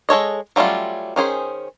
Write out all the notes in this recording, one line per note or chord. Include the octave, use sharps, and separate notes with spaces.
G#3 A4 C#5 D#5
F#3 G3 A3 C#4 F4
D#3 C#4 G#4 C5